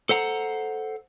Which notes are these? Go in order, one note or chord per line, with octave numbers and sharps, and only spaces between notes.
A4 C5 F#5 A#5